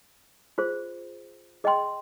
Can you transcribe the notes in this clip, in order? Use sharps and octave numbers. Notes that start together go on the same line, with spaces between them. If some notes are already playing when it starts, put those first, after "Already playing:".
F4 G#4 C5
G#4 D#5 G5 C6